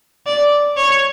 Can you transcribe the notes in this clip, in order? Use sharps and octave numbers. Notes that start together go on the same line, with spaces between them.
D5
C#5